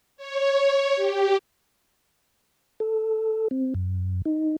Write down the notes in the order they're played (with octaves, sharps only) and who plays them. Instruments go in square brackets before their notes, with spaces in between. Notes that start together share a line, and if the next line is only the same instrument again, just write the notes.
[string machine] C#5
G4
[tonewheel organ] A4
C4
F#2
D#4